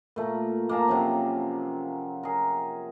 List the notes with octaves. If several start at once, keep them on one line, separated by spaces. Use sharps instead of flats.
A#2 A3
A#3 G#4 A5 A#5
C3 F3 F#3 C#4
G#4 A#4